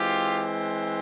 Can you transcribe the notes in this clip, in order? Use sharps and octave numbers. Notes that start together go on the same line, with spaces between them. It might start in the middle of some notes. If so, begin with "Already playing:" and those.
Already playing: E3 G#3 C4 F4 G4